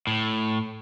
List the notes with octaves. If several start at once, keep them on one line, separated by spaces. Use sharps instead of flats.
A2